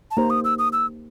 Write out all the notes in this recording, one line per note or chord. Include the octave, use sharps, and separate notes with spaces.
A5
A#3 D#4 G4 C5 A#5
D#6
E6
D#6
E6